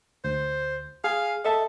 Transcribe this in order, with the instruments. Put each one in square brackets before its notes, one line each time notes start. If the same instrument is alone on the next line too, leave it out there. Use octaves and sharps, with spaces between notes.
[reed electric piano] D2 [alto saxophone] C5
[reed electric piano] G#4 G#5 [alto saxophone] F5
[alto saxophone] A4 [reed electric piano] D#5 E5 A5